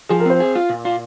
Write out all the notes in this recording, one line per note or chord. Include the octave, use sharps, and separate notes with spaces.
F3 G#4
A#4
C4 C5
G#4
F4
A#2
F4